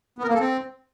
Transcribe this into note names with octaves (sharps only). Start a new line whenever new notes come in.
B3
A#4
A#3
A4
C4